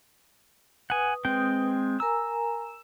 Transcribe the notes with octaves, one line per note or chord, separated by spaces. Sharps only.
B4 F#5 G#5 D#6
G#3 C4 G5
A#4 G#5 A#5 E6